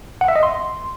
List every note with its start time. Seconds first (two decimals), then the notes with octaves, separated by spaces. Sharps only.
0.21 F#5
0.28 E5
0.36 D#5
0.43 C6